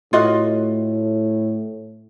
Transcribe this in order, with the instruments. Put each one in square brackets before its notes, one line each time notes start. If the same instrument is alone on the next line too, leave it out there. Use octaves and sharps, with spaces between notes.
[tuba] A2 [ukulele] F4 F#4 D#5